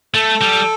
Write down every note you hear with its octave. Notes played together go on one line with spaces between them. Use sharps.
A3 A4
G3